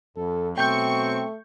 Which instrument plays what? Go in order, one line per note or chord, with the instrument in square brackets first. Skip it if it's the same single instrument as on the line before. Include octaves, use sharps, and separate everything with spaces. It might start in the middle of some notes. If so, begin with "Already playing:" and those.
[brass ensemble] F2 [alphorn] A4
[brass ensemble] B2 F#3 C4 [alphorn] A3 [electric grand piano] G5 G6 [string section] C#6